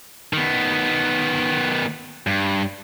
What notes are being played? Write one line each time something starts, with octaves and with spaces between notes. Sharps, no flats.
D#3 B3
G2